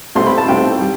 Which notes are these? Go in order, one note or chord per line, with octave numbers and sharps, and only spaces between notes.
C2 B2 A3 C4 C6
B5
A5
C2 B2 A3 C4 G5
G3